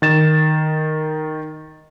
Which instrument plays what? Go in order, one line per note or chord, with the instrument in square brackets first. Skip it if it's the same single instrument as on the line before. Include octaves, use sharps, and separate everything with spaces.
[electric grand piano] D#3 A6 E7